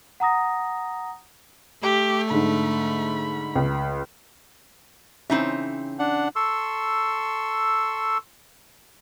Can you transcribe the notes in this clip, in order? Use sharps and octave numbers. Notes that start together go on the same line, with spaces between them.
F#5 A#5 D#6 A#6
A3 G4
G#2 D3 B5
C#2
C#3 E3 C4 D#4 C5 E5
D4 F#5
A4 C6 C#6 E6